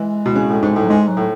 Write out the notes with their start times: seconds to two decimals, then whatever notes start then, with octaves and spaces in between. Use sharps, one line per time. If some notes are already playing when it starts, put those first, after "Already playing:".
Already playing: E3 G#3
0.26 B2
0.36 C#3
0.50 A2
0.63 G#2
0.76 A2
0.83 F#3
0.89 G#2 G#3
1.08 F#3
1.17 A2